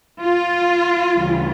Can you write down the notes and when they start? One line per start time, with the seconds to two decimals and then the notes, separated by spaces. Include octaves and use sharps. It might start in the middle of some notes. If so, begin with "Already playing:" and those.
0.22 F4
1.14 D2 C#3 E3 G3